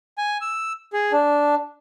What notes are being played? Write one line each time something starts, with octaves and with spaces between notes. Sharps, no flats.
G#5
E6
G#4
D4